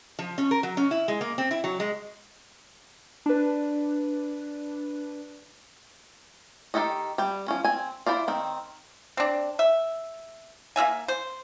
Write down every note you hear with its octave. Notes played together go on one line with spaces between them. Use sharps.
F3
C#4
A#4
F#3
C#4
E4
G#3
A#3
C4
E4
F#3
G#3
D4 B4
D#3 E3 G4 A4 D#5
G3 G5
F3 C#4
C4 G#5
E4 C5 D5 F5
D#3 C4
C4 D4
E5
A#3 F4 E5 G#5
C5